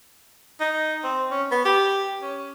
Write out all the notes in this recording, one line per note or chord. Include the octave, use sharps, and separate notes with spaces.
D#4
C4
C#4
B3
G4
C#4